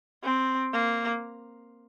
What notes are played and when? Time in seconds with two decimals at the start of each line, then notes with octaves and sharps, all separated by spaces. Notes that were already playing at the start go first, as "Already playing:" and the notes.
0.23 C4
0.73 A#3